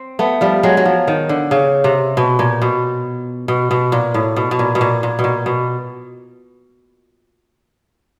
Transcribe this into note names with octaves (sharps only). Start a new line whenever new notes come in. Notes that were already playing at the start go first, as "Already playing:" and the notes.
Already playing: C4
A3 B3
F3 G3
F#3 G#3
F#3
F3
D#3
D3
C#3
C3
B2
A#2
B2
B2
B2
A#2
A2
B2
B2
A#2
B2
A#2
A#2
B2
A#2
B2